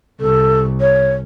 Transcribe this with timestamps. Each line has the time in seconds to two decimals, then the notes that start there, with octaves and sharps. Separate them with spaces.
0.21 C2 A4
0.81 C#5